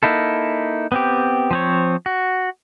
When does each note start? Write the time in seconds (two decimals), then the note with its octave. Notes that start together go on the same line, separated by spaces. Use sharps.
0.03 A#3 D#4 E4 A4
0.92 B3 C4 G4
1.51 F3 C4 C#5
2.06 F#4